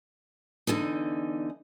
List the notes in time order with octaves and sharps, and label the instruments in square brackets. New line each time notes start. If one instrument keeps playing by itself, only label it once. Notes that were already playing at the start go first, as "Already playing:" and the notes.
[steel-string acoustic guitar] E2 D3 E3 D#4